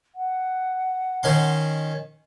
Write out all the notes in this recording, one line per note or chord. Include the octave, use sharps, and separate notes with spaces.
F#5
D#3 C#4 C6